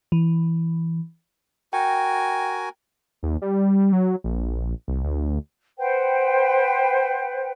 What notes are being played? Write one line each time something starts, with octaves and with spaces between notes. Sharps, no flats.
E3
F#4 A#4 G5 G#5
D#2
G3
F#3
A#1
C2
D2
B4 C5 F#5 G5